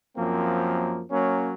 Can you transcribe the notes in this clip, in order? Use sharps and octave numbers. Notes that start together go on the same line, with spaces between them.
F#2 F3 A#3 C4
F#3 A#3 C#4